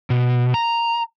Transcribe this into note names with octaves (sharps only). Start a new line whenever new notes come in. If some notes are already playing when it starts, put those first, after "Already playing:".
B2
A#5